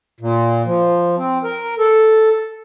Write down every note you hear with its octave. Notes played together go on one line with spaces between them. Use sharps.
A#2
F3
C4
A#4
A4